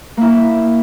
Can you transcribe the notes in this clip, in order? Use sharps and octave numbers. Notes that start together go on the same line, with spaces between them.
A#3 E4